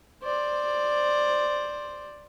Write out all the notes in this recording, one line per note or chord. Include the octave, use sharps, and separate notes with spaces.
C5 D5